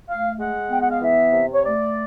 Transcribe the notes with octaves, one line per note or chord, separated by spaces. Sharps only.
A3 F5
G#3 F#5
B3 G5
F#5
F5
E3 E5
C3
C#5
A3 D5